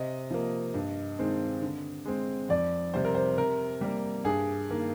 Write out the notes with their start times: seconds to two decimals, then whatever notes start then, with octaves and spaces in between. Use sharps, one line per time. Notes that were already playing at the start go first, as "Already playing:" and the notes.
Already playing: C3 D#5
0.31 F3 A#3
0.74 G2
1.19 D#3 G#3 C4
1.62 D3
2.06 G#3 C4
2.49 F2 D5
2.94 C3 G3 C4 C5
3.05 A#4
3.15 C5
3.37 C3 A#4
3.81 G3 A#3
4.24 G2 G#4
4.69 D#3 A#3